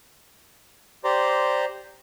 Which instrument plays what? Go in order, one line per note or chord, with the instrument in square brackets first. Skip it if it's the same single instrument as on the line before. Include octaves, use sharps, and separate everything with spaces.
[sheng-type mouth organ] G4 C5 D5 A#5 C6